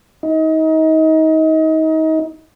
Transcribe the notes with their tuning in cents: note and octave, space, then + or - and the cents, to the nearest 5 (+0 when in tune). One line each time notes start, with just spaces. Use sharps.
D#4 +30